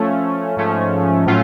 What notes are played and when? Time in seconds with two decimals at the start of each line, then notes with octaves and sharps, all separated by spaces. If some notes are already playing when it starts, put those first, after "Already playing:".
Already playing: F3 A3 C#4
0.57 G#2 F3 A3 C#4
1.26 A2 F#3 A3 C#4 F4